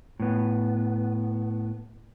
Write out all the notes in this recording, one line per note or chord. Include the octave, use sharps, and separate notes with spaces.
A2 B3